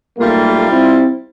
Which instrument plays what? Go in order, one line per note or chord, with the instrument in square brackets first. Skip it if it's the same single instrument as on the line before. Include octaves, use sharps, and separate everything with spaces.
[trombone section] B1 A3 A#3 [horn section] G3 F4
[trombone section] C4 E4